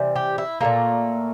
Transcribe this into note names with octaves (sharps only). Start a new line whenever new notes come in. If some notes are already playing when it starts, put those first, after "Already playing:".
Already playing: C3 E3 G3
G4
E4
A#2 F3 A3 A#3